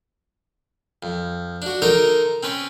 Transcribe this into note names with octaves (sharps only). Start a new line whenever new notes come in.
F2
D4 F#4
D#4 A4 A#4 C5 G5 C6
C4 C#4 B4